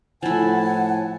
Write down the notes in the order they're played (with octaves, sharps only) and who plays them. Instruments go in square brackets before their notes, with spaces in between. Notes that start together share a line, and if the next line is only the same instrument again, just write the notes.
[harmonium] A2 G#5 A5 [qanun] F3 E4 [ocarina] F#5